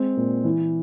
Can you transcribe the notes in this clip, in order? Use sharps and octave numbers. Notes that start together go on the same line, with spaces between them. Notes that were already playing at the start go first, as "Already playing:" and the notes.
Already playing: G#3 C4
A#2
E3